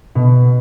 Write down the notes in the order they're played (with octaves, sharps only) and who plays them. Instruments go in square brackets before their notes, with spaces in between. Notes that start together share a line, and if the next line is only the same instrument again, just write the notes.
[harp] B2